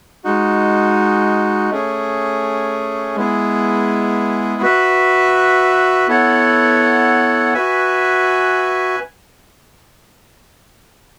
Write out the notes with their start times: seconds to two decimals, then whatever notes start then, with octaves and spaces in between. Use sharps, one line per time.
0.24 G#3 D#4 F#4
1.71 A3 C#4 G#4
3.16 G#3 B3 E4 G#4
4.62 F#4 B4 E5
6.08 B3 E4 A4 C#5 F#5
7.54 F#4 B4 E5 G#5